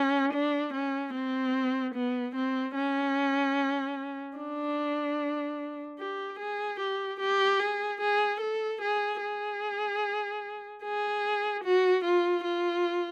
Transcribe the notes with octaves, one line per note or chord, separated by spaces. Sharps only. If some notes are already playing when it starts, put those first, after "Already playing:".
Already playing: C#4
D4
C#4
C4
B3
C4
C#4
D4
G4
G#4
G4
G4
G#4
G#4
A4
G#4
G#4
G#4
F#4
F4
F4